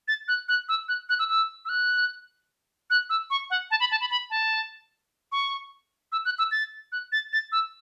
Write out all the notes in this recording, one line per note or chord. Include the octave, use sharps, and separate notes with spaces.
A6
F#6
F#6
E6
F#6
F#6
E6
E6
E6
F#6
F#6
E6
C#6
F#5
A5
B5
A5
B5
B5
A5
C#6
E6
F#6
E6
A6
F#6
A6
A6
E6